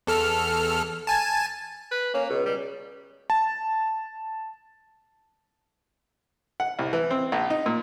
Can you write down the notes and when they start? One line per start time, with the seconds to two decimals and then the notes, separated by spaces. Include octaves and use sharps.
0.07 E2 A4 F6
1.07 G#5 A5
1.91 B4
2.14 A#3 C#4
2.29 C#2 B2
2.45 G3
3.30 A5
6.60 F#5
6.79 C2
6.93 E3
7.11 C4
7.32 A#1
7.50 D#4
7.66 A#2